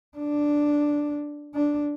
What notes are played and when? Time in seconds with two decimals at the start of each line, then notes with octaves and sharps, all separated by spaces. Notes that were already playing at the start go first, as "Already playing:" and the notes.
0.18 D4
1.54 D4